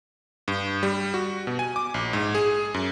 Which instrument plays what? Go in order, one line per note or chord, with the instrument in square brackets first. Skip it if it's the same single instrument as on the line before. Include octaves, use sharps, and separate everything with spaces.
[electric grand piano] G2
G3
F#4
B2
G#5
D6
A#1
G#2
G#4
F#2